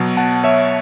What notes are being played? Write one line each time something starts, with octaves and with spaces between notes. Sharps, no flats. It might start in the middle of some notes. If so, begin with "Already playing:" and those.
Already playing: B2 F#3
F#5 A5
C#5 E5